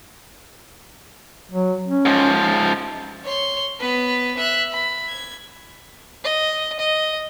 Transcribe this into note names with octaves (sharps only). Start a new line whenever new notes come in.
F#3
C#4
G#2 F3
C#5 C6
B3 B4
E5 F#6
B5
G#6
D#5
D#5